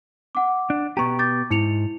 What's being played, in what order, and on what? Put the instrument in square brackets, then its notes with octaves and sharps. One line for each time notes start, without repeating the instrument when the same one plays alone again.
[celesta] F#5 D6
[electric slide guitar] D4
[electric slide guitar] B2 B3 G4 [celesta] A#5 C#6
[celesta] D6 G6 A6
[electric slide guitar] G#2 [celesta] E4 C#7 F7